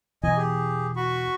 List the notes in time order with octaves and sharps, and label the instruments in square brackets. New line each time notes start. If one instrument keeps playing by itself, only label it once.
[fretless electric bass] E2 B2 E3 [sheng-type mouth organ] D#5 G#5
[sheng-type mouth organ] G4 G#4
F#4 B5 C#6